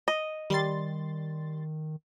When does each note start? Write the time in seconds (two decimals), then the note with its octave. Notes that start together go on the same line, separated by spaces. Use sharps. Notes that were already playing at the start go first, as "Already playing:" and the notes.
0.08 D#5
0.50 D#3 G3 C6 A6